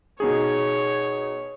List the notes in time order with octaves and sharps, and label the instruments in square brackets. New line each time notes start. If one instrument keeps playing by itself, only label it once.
[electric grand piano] B2 D#4 G#4 [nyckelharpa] C#5